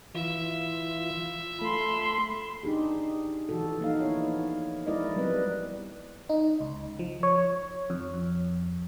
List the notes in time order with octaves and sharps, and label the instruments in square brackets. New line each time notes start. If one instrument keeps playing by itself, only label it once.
[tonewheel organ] E3 [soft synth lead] F4 [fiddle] E5
[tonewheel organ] A3 [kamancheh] B5 C6
[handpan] D4 D#4 G4 G#4
E3 F3 F#4 A4
A#3 D#4 F5
F3 B3 E4 C#5
F3 G#3 E4 A#4 D5 D#5
F#3 G3 B3 C4 B4 D#5
[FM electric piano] D#4
C#2
F3
C#5
F2